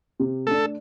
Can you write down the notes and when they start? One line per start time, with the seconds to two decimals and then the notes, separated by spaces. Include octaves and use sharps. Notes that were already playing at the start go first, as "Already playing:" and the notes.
0.20 C3
0.47 A3 D4 A4